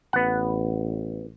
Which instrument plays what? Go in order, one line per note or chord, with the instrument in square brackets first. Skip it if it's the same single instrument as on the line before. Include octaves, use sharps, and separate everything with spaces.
[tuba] A1 [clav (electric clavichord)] B3 F#5